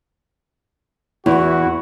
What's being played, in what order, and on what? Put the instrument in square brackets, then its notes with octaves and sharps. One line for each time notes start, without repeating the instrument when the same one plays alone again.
[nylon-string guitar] E2 [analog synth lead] E4 [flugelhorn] F#4